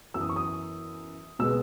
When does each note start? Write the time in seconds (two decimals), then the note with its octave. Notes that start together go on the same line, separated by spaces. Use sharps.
0.14 F#2 E3 B3 E6
0.21 D#6
0.29 C#6
0.36 D#6
1.39 B2 G#3 B3 E6